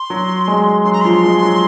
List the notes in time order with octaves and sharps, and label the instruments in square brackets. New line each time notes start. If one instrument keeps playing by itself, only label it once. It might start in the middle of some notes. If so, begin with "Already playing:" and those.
Already playing: [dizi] C6
[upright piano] F#3
G#3
[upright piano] F#3 [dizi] C6
[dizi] A#5
[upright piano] F3 [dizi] C6
[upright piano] G#3
F#3